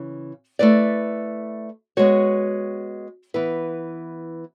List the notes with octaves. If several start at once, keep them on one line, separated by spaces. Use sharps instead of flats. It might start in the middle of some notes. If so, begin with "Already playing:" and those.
Already playing: C#3 E3
A3 E4 B4 D5
G#3 B3 F#4 C#5
E3 B3 E4 B4